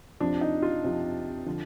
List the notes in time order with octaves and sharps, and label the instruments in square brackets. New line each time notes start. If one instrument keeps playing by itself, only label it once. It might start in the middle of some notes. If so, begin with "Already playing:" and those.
[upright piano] F2 C3 F3 D4
D#4
F4
F2 C3 F3
D3 F3